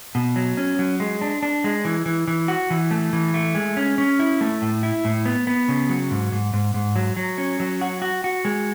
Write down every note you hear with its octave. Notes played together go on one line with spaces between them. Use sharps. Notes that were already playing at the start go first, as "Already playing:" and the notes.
B2
F#3
C#4
F#3
G#3
D4
D4
G#3
E3
E3
E3
F#4
E3
A3
E3
A3
G#3
C#4
C#4
E4
A3
A2
E4
A2
B3
B3
C#3
F#3
G#2
G#2
G#2
G#2
F#3
F#3
C#4
F#3
F#4
F#4
F#4
G#3